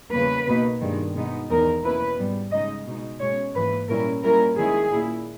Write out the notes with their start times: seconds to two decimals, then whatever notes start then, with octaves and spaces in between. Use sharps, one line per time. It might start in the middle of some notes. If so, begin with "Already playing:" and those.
0.12 E2 C#3 G3 A#3 B4
0.47 B2 A#3 D#4
0.81 G2 D#3 G#3
1.15 B2 G#3 B3 D#4
1.49 E2 D#3 G#3 D#4 A#4
1.83 B2 A#3 C#4 E4 B4
2.17 G#2 G3 B3
2.52 C#3 G#3 D#4 D#5
2.86 B2 G#3 D#4
3.20 B2 G#3 C#4 C#5
3.54 G#2 E3 A#3 B4
3.88 A#2 G3 C#4 E4 A#4
4.23 A#2 G3 C#4 E4 A#4
4.57 D#3 G#3 C#4 E4 G#4
4.92 A#2 A#3 E4